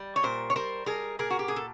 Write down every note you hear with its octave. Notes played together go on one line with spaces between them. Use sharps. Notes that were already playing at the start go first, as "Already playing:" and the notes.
Already playing: G3
C#5
A#2 A#4 C5
C#5
G3 A#4 C5
G3 G#4 A#4
A#2 G#4 A#4
F#4
G4
A#2 G#4
A4